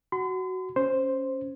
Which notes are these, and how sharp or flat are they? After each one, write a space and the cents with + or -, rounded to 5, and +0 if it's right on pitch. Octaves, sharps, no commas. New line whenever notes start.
F#4 +10 C6 -45
C#4 +0 C5 +0